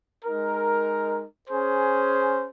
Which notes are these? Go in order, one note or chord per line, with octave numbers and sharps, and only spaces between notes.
G#3 D#4 A#4
C#4 G#4 C5